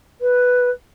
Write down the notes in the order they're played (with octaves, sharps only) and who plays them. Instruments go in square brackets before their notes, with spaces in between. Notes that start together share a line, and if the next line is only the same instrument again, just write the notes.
[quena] B4